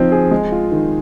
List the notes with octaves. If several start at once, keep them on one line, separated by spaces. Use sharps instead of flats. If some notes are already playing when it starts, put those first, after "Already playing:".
Already playing: F3 C4 D#4
G#4
G#3
F4
D#3